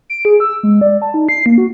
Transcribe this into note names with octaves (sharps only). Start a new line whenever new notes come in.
D7
G#4
E6
G#3
D5
A5
D#4
C7
A#3
F#4